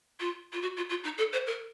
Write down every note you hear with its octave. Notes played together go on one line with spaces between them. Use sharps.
F4
F4
F#4
F4
F4
D#4
A4
C5
A#4